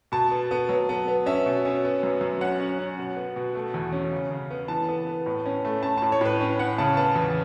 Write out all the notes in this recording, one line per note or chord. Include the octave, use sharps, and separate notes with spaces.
B2 A5
B3
B3
F#3
B3
B3
C#4 E5
B2
C#4
B3
F#2
F#2
C#4 F#5
C#4
C#4
B2
B3
B2
A3
E2
C#4
C#3
C#3
B3
E3 A5
B3
B3
A2
C#4
A3
C#4 A5
A2 A5
C#5
A2 B4
C#4
C#4 F#5
C#3 A5
B3 A5
E2